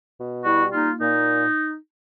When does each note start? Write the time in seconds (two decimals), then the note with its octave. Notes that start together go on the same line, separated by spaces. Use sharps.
0.18 B2
0.44 G3 E4 F#4
0.72 A#3 D#4 F4
0.99 A#2 D#4